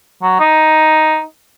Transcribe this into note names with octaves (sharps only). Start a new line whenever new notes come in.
F#3
D#4